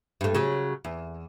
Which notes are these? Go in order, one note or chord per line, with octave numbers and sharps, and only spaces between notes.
G2 A3
C#3 F#3
E2